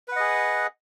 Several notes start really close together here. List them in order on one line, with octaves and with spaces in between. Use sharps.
B4 F#5 D#5 G#4